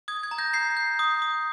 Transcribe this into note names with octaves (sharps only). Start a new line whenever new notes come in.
D#6 G#6
G#6
A#5
G6 A#6
G6 G#6 C7
G6
D#6
D#6